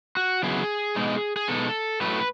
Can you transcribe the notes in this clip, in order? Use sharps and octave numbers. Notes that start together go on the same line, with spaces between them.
F#4
C#3 F#3 B3 E4 G#4
B2 G#3 D#4
G#4
B2 G#3 D#4 A4
A2 F#3 A3 B4